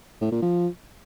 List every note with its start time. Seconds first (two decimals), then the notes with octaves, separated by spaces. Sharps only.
0.21 A2
0.32 A#2
0.42 F3